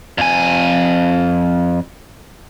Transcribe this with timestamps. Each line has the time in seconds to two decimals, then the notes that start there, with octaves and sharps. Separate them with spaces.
0.18 F2 G#5